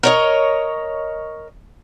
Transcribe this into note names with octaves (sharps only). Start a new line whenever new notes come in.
A#4 C#5 D#5